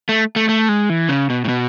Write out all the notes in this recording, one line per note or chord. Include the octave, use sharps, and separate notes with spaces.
A3
A3
A3
G#3
E3
C#3
B2
A2
B2